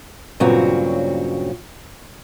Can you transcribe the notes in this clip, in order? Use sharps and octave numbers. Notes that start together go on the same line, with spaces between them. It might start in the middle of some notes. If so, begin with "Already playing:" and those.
G2 A#2 C#3 F#3 C4 F#4